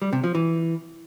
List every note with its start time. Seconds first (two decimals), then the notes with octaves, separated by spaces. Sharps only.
0.02 G3
0.13 C3
0.24 F3
0.35 E3